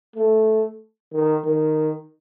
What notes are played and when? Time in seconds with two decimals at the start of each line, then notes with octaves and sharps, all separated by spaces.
0.16 A3
1.13 D#3
1.45 D#3